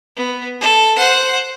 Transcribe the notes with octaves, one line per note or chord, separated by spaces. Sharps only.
B3
A4
C5 F#5